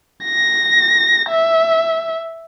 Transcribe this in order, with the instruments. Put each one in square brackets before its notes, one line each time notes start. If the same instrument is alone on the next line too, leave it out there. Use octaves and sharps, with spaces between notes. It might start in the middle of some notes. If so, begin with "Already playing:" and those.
[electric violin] A#6
E5